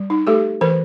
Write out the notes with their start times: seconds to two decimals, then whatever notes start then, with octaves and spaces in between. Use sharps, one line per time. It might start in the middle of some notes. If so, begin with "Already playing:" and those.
Already playing: G3
0.10 D#4
0.27 A3 G4 A4
0.61 E3 A#4 C5